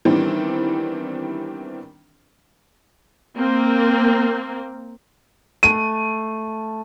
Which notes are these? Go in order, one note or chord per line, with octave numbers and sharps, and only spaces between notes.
D#3 E3 G3 B3 C4 D4
A#3 C4
A3 D#7